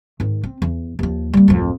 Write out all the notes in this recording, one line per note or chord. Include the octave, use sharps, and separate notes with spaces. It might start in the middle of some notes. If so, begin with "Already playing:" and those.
G#2 D#3
C4
E2
D#2 F3
G3 A#3
D1 F2